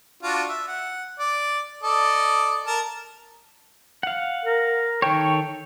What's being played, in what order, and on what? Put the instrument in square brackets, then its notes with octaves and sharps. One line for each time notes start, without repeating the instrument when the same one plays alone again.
[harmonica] D4 F4 F#4
E5
F#5
D5
A4 D5 D#5
A#4 A5 A#5
[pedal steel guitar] F5 F#5
[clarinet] A#4
[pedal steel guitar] D#3 A4 C#5 [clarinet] G5